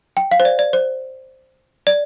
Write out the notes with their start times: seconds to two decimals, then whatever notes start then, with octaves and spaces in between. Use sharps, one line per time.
0.17 G5
0.31 F5
0.40 C5
0.45 D5
0.59 D5
0.73 C5
1.87 D5